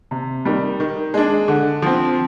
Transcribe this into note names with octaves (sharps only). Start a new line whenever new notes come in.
C3
D#3 G3
D#3
G#3 D4
D3
F3 C4